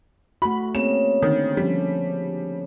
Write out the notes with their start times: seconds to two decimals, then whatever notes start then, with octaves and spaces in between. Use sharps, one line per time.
0.42 A3 F#4 B5
0.75 C#3 A#3 C4 E7
1.22 D3 D#3 C4
1.57 F3 G3 C#4 D4